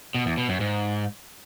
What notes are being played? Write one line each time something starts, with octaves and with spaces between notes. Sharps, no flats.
B2
E2
B2
F#2
G#2